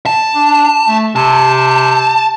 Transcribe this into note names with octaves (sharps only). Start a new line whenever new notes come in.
A5
D4
A3
C3 A5